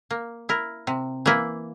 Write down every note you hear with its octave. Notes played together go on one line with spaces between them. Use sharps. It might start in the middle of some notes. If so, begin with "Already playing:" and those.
A#3
E4 A#4
C3
E3 A#3 E4